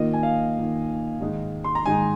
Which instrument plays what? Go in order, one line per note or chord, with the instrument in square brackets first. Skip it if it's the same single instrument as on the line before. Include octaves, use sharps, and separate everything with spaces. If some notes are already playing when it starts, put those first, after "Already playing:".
Already playing: [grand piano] D#3 A#3 F4 D#5
G#5
F5
D#3 A#3 F4
G#2 D#3 G#3 D#4
C6
A#5
G#2 D#3 G#3 D#4 G#5